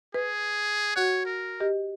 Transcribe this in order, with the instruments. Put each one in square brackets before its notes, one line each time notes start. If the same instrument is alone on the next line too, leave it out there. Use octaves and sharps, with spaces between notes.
[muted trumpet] G#4 [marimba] B4
[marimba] F#4 F#5 F#6 [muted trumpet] C#5
[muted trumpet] A#4
[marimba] G4 D#5